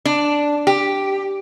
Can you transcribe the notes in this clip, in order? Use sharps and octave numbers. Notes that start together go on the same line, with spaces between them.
D4
G4